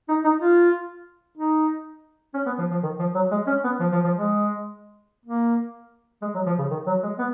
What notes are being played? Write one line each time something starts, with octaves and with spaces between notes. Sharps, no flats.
D#4
D#4
F4
D#4
C#4
B3
F3
F3
D#3
F3
F#3
G#3
C#4
B3
F3
F3
F3
G#3
A#3
G#3
F#3
F3
C#3
D#3
F#3
G#3
B3